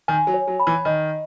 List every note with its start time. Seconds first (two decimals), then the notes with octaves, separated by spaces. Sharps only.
0.08 D#3 G#5
0.27 F#3
0.34 C#5
0.47 F#3
0.60 B5
0.67 E3
0.85 D#3 D#5